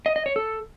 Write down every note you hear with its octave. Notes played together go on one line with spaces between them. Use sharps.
D#5
D#5
C#5
A4